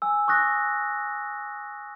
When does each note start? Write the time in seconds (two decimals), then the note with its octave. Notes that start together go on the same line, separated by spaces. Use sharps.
0.02 G#5 E6
0.28 C#6 D#6 F#6 A#6